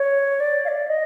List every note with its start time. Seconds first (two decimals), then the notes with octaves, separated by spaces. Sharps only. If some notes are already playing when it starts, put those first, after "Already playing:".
Already playing: C#5
0.40 D5
0.65 F5
0.68 D5
0.88 D#5